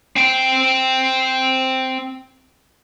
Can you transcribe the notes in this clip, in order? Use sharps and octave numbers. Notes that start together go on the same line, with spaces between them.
C4 G5